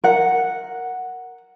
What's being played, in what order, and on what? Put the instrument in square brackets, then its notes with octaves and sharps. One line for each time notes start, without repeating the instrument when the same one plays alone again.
[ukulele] A#4 F#5